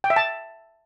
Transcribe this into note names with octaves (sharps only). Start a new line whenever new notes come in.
G5
E5
A5